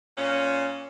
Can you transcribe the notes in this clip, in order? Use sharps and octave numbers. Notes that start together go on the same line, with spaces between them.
A#2 C#4